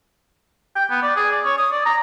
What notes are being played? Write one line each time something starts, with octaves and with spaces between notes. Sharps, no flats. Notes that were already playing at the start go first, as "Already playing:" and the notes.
G5
B3
D5
G#4
D5
C#5
D#6
D5
A#5